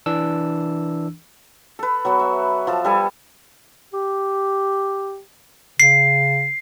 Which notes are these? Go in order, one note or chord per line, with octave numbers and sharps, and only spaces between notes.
E3 D4 E6
A4 B4
F#3 B3 F#4
E5
F3 A4
G3 A4 G#5
G4
C#3 C7